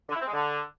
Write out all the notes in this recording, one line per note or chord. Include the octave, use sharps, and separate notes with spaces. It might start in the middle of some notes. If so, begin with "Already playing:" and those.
D3
E4
C4
G#3
D3